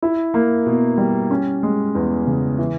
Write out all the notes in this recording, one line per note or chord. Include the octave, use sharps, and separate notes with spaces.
E4
A#3
B2
G3
C#4
G#3
E2
C#3
E3